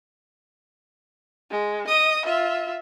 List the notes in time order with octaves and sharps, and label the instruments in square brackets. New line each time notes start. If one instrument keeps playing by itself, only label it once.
[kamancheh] G#3
D#5 D#6
F4 E5